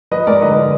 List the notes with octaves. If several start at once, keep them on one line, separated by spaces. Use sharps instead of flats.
F3 B4 D#5
G#3 A#4 D5
D3 B4 D#5
D3